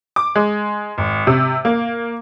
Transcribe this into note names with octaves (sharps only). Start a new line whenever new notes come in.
D6
G#3
G#1
C3
A#3